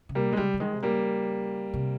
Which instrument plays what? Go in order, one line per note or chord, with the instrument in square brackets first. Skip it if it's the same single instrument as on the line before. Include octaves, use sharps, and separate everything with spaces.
[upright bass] C#3
[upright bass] C3 [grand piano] G3 A#3
[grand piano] G#3
[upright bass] C#3 [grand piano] G3
[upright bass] C#3
[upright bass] D#3 [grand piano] G#3
[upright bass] C3
[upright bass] C#3 [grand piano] G3 A#3
[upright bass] C3